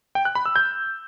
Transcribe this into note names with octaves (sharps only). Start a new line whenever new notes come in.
G5
F#6
B5
E6
G6